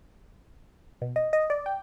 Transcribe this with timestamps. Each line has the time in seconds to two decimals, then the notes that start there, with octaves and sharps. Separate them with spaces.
1.02 B2
1.16 D#5
1.33 D#5
1.50 D5
1.66 G5